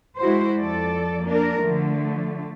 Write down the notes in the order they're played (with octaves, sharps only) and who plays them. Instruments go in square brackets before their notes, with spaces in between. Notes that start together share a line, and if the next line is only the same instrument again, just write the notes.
[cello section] G#3 E4 F#4 C5
F2 A4 D5
A#3 D4 A#4
D3 F3 A3